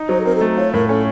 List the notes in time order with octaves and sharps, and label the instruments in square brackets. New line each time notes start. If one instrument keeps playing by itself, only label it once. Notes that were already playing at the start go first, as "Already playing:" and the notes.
Already playing: [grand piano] D#4
[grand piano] F#3 [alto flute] C5
[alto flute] A4
[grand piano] C4 [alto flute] A#4
[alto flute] A4
[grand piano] A3
[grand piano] F4 [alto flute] C#5
[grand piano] A2 [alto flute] A#4
[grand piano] C#4 [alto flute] A4